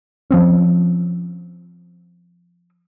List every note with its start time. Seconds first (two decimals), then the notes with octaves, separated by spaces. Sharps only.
0.31 F3 C4 C#4